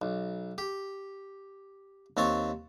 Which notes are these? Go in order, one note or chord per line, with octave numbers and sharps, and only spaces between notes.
B1
G4
D#2 C4 C#5 A5 C#6